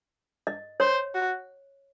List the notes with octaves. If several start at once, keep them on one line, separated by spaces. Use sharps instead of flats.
D#5
C5 C#5
F#4